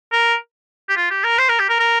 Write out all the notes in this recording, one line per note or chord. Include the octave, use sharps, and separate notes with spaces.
A#4
G4
F4
G4
A#4
C5
A#4
G4
A#4
A#4